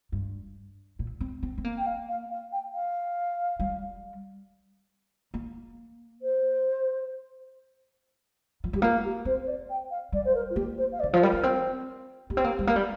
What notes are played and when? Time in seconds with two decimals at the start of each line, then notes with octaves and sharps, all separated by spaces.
0.12 G2
0.99 A#2
1.21 C4
1.43 C4
1.58 C4
1.64 A#3
1.77 G5
1.86 F5
2.08 F5
2.30 F5
2.51 G5
2.72 F5
3.60 G3
5.34 A#3
6.21 C5
8.64 F3
8.73 G3 G4
8.81 A#3 F4
9.04 G4
9.25 C4 C5
9.42 C5
9.47 D5
9.69 G5
9.90 F5
10.12 G3 D5
10.24 C5
10.34 A#4
10.49 F4
10.55 A#3 G4
10.77 C5
10.92 F5
10.99 D5
11.03 D3
11.13 F3
11.21 G3 A#4
11.33 A#3
11.43 C4
12.30 A#3 G4
12.37 C4
12.44 A#3
12.59 G3
12.67 A#3
12.76 G3